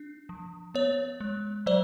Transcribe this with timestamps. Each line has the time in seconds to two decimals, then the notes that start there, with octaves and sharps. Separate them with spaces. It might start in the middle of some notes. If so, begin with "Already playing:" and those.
Already playing: D4
0.29 F3
0.75 B3 C#5
1.21 G#3
1.66 F#3 C5 D5